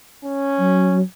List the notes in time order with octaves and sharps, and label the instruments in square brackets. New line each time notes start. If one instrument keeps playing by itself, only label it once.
[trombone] C#4
[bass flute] F#3